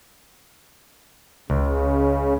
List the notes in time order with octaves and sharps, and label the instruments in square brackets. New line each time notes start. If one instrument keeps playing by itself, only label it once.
[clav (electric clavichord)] C#2 [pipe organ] C#3